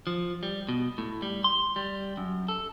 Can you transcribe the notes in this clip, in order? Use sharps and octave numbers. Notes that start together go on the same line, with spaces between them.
F3
G3
B2
A2
G3
C6
G3
F#2
A4